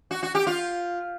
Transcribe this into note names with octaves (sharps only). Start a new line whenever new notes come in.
F#4
F#4
G4
F4